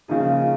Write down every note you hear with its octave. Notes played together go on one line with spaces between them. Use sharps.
C#3 F3 A#3 D#4 G#4